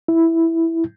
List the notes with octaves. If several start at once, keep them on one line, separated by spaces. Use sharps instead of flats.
E4